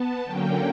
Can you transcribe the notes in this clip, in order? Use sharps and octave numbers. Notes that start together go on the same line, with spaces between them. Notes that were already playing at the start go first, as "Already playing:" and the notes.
Already playing: B3 A5
D3 F#3 A#3 C#4 G5